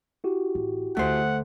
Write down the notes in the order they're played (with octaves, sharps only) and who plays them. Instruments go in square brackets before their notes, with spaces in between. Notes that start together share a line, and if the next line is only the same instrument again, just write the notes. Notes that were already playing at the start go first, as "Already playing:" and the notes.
[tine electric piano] E4 F#4 G4
[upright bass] A1
[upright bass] D2 [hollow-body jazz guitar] A3 C5 [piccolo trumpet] F#5